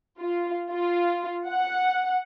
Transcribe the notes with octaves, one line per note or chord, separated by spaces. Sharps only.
F4
F4
F#5